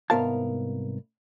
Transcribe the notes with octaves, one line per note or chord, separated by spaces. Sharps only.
C2 G#2 B3 A#4 F5 A5